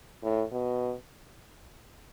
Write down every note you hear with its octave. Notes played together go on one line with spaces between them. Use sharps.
A2
B2